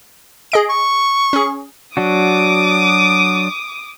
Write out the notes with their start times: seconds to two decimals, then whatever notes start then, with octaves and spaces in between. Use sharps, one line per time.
0.52 G#4 D#5 D7
0.70 C#6
1.33 C#4 G#4
1.97 F#3 D4 F#4 D6 D#6